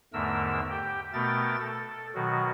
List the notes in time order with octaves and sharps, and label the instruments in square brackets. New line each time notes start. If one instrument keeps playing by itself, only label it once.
[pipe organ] E2 G#2 D3 A3 A#4 E6
G4 G5
B2 A3 B3 A#4 G5 A6
A4
B2 D#3 F#3 F#4